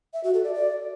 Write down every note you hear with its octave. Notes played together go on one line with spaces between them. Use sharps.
E5
F#4
A4
D5
D5